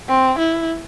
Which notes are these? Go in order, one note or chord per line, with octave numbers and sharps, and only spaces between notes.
C4
E4